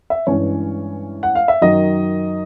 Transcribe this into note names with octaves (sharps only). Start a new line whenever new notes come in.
E5
G2 E3 G#3 C#4 C#5
F#5
F5
E5
F#2 D#3 F#3 D#5